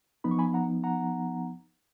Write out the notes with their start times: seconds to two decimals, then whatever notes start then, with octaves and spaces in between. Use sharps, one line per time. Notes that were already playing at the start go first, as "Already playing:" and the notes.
0.24 F3 B3 D#4 B5
0.31 C#6
0.39 G#5 B5
0.54 F#5 A#5
0.84 F#5 A#5